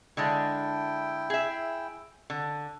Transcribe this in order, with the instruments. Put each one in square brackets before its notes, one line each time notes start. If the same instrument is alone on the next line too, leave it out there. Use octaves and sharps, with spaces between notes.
[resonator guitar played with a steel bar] D3 G#3 D4 [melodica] E4 G5
[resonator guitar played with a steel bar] G#4 E5
D3